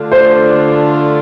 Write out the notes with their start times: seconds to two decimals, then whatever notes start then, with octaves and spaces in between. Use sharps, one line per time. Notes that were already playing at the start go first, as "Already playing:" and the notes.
Already playing: D3 A3 D4 F4
0.12 C5